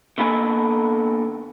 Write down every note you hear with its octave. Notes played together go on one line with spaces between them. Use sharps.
D3 A#3 B3 A4 D#5 G#5